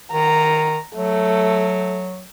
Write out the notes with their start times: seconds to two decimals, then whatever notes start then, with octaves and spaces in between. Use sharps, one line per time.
0.12 D#3 A#5
0.96 F#3 A3